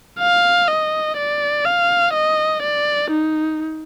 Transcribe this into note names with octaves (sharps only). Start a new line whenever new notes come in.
F5
D#5
D5
F5
D#5
D5
D#4